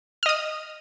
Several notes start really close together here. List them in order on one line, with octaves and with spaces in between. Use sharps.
F6 D#5 D#6